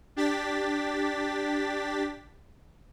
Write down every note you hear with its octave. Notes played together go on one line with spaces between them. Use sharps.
D4 G4 A6 B6